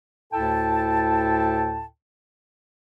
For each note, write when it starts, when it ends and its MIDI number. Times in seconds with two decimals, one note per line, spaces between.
0.33 1.86 38
0.33 1.86 45
0.33 1.86 64
0.33 1.86 69
0.33 1.86 79
0.33 1.86 81